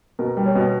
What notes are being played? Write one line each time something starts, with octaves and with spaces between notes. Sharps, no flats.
B2 A#4
G3
C#5
B2